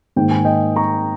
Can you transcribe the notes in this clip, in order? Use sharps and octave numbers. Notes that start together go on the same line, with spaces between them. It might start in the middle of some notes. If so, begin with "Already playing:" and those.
G#2 D#3 A#3 G5
G#5
D#5 G5
A#5 C#6